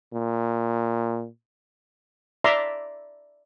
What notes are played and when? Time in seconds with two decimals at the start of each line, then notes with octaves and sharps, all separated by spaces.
0.13 A#2
2.44 D5 E5 A#5 C6